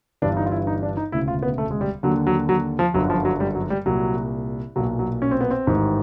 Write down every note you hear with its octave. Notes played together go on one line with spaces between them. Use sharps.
G1 G2 E3 D4
D#4
F4
E4
D#4
D4
D#4
E1 D2 C#3 E4
F4
B3
A3
G#3
G3
D#2 D3 F#3
F#3
F#3
F3
G1 F#2 D3 F#3
F3
F#3
G3
F#3
G3
C2 A#2 F#3
B1 A#2 F#3
F#3
C#4
C4
B3
C4
A1 G#2 D#3